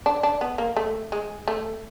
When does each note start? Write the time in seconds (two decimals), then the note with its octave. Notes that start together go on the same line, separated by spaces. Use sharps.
0.06 D4
0.23 D4
0.41 B3
0.58 A#3
0.77 A3
1.12 G#3
1.48 A3